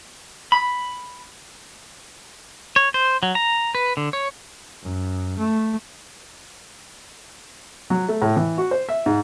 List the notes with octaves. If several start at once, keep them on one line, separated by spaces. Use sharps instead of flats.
B5
C#5
C5
F#3
A#5
B4
D3
C#5
F#2
A3
F#3
A3
A2
E3
F#4
C5
E5
G#2